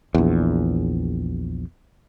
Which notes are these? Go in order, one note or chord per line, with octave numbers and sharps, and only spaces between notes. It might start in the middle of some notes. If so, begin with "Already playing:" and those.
A#1 E2